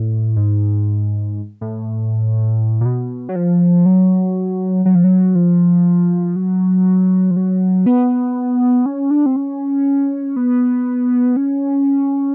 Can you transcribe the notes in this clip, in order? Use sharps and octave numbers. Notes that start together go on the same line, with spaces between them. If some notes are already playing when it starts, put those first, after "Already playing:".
Already playing: A2
G#2
A2
A#2
B2
F#3
F3
F#3
F#3
F3
F#3
F3
F#3
F3
F#3
B3
C#4
D4
C4
C#4
B3
C#4